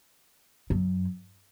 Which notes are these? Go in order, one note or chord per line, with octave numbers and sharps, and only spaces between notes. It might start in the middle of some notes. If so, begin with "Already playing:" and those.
F#2